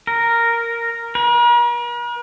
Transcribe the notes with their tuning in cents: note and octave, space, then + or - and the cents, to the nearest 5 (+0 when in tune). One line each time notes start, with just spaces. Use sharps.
A#4 -5
A#4 +45